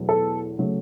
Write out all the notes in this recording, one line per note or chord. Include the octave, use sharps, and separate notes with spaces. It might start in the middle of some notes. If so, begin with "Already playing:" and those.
Already playing: E2 B2 F#3 A3
A4
C#3 F#3 A3